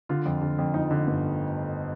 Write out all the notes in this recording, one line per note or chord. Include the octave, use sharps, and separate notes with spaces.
D3 F4
F2
D3
F2
F2 D#4
D3
G1